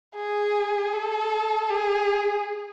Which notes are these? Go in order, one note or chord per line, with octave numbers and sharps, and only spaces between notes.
G#4
A4
G#4